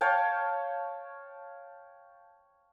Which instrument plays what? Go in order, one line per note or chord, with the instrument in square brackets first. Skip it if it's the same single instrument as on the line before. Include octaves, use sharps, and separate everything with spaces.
[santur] C#5 F5 G5 A5